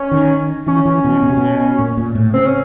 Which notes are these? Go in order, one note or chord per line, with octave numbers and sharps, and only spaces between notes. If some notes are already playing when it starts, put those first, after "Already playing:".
Already playing: C#4
D#3
E3 C#4
E3
B2
B2
C3
B2
A#2
A#2
A2
C#3 C4
C#4